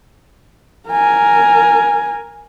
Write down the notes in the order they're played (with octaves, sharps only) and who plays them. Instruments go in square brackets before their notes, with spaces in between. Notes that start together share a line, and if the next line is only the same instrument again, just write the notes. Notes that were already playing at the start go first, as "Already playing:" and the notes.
[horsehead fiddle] A#4 G#5